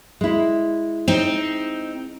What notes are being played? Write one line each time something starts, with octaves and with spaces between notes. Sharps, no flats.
G#3 E4
C4 D#4